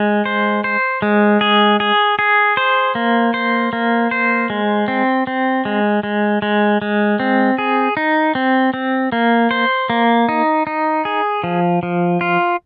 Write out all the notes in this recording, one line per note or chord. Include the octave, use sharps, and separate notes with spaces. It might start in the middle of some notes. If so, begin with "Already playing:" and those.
Already playing: G#3
C5
C5
G#3
G#4
G#4
G#4
C5
A#3
C5
A#3
C5
G#3
C4
C4
G#3
G#3
G#3
G#3
C4
G#4
D#4
C4
C4
A#3
C5
A#3
D#4
D#4
G#4
F3
F3
F4